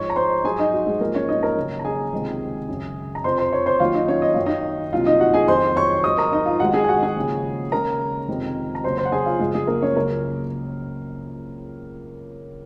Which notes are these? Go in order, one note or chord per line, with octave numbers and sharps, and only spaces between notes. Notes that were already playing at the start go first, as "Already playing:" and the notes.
Already playing: G#2 F3 G#3 C#5 C#6
A#5
C5 C6
G#2 F#3 G#4 G#5
D#4 D#5
F#4
G#3 G#4
G#2 F3 G#3 A#3 A#4
C#4 C#5
D#4 D#5
A#4 A#5
D#2 C#3 F#3
A#5
G#4 G#5
C#2 C3 D#3 G#3
F#2 C#3 F#3
A#5
F2 C3 F3 C5 C6
C5 C6
C#5 C#6
C5 C6
D#2 D#3 F#3 F4 F5
D#4 D#5
C#4 C#5
D#5
F#2 D#3 F#3 F5
D#4 D#5
C2 A#2 F#3 F4 F5
D#4 D#5
F#4 F#5
G#4 G#5
F2 D#3 F#3 C5 C6
C#5 C#6
G#2 F#3 D#5 D#6
A#4 A#5
D#4 D#5
F4 F5
G#2 D#3 G#3 F#4 F#5
G#4 G#5
G#5
F#4 F#5
G#4 G#5
D#2 C#3 F3
D#2 C#3 G#3 A#4 A#5
F2 C3 D#3 G#3
A#5
D#2 C#3 F#3 C5 C6
C5 C6
F#5
G#4 G#5
F4 F5
F#2 C#3 F3 G#3 G#4
G#3 G#4
A#3 A#4
C#4 C#5
C#2 C#3 F#3 A#3 A#4